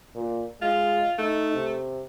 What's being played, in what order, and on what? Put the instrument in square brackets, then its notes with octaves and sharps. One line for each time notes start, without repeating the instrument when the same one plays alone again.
[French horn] A#2
[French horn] G#3 [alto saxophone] F4
[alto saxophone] A3 [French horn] D#4
[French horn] C3